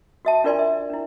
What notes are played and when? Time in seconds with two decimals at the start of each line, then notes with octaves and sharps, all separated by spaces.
0.25 F#4 E5 A5
0.44 D4 F4 A#4 D5 G#5 C6
0.59 E5
0.90 D4 E4